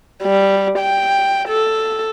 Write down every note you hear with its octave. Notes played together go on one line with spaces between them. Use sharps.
G3
G5
A4